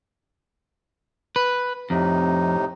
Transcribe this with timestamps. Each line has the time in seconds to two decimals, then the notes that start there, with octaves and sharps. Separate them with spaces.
1.36 B4
1.90 F2 A2 C3 D#4